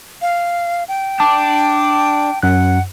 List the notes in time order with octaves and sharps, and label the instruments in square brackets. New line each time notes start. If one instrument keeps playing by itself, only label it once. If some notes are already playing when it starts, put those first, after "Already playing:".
[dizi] F5
G5
[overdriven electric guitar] D4 [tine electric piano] A5
[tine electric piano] F#2 F#6 [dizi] F#5